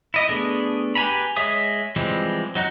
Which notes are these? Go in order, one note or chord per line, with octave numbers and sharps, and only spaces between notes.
E4 D#5 D#6
A3 B3 D4 G#4 A4
G4 B4 G#5 A#5 B5
G#3 C#5 E5 D#6
E3 F3 G3 G#3 C4
F#3 D#4 F#4 F#6